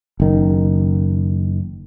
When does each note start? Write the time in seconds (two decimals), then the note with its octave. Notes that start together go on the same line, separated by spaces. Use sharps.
0.20 F#1 D#3